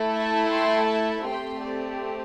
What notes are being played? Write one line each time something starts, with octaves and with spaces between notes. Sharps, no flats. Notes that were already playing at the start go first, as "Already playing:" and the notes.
Already playing: A3 E4 A4
E5 A5
G5 C6
E5 A5
A3 C4 G4 G5 C6
D5